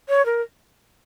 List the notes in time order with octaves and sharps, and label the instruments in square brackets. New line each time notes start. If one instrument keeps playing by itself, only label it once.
[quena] C#5
A#4